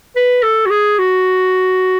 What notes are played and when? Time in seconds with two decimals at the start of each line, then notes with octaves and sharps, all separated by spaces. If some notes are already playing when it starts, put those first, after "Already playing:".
0.16 B4
0.43 A4
0.66 F#4
0.71 G#4
0.99 F#4